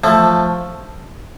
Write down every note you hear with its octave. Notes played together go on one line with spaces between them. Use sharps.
F3 A3